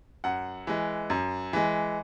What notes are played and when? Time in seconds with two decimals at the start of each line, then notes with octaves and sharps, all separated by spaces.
0.24 F#2 F#5
0.67 E3 G#3
1.10 F#2
1.53 E3 G#3